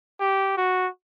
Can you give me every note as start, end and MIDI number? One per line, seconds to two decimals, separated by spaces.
0.20 0.55 67
0.57 0.88 66